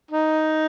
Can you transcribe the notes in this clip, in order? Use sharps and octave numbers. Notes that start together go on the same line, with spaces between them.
D#4